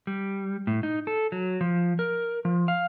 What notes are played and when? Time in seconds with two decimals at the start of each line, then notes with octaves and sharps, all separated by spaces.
0.07 G3
0.67 A2
0.83 D#4
1.07 A4
1.32 F#3
1.61 F3
1.99 A#4
2.45 F3
2.68 F5